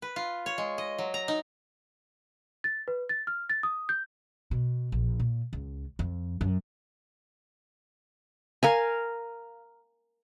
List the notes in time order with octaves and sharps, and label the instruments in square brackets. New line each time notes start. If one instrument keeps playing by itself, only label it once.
[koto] B4
F4
C#5
G#3
D#5
F#3
A#5
D#4
[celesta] A6
B4
A6
F6
A6
D#6
G6
[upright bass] B2
A#1
A#2
C#2
F2
F#2
[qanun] A#4 F5 G#5